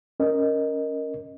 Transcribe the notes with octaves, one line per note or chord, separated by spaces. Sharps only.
C#4 A#4 D#5